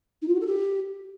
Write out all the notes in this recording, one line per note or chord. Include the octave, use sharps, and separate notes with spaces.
D#4
F4
F#4
A4
G4